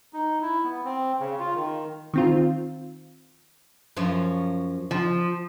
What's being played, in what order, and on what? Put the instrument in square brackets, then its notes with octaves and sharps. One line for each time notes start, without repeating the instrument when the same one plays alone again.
[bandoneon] D#4
E4
B3
C4
C#3
F4
D#3
[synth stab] D#3 C4 F4
[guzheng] F#2 F3 C#5
[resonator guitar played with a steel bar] F3